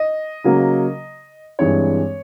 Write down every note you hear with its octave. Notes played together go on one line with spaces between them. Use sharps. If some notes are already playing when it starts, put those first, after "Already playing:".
Already playing: D#5
C#3 F#3 A#3
G2 E3 G#3 C4 C#5